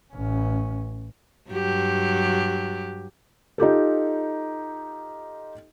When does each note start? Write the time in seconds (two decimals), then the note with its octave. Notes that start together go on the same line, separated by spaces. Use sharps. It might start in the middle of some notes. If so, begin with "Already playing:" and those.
0.13 A1 C#4
1.50 G2 F#3 G4
3.58 D#4 F4 G4 A4